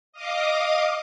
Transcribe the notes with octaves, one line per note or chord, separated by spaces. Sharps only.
D#5 F5 D6 D#6